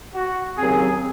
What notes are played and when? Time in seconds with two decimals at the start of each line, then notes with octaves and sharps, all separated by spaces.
0.14 F#4
0.57 D#2 C#3 F#3 C4 G#4